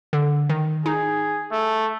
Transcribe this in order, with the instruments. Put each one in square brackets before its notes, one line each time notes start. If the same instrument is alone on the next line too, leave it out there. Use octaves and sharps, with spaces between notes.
[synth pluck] D3
D#3
[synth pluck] D#4 [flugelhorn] G#4
[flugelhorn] A3